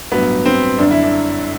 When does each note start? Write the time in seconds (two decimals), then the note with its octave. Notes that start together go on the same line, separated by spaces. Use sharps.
0.12 A1 G2 F#3 B3
0.46 C4
0.78 G1 F#2 D3 D4
0.91 E4
1.03 D4